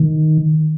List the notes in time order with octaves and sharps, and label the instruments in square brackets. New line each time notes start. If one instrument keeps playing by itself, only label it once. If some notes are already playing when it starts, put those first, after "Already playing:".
Already playing: [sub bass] D#3